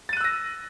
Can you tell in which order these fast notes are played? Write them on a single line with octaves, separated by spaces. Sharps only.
A6 D#7 F#6 E6 A#6